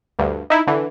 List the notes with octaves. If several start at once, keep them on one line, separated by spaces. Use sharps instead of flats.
D2 G2
D#4 E4
D3 E3